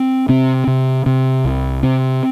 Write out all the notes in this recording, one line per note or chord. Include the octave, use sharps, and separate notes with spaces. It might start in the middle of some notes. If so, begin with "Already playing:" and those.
Already playing: C4
C3 C4
C3
C3 C4
C2
C3 C4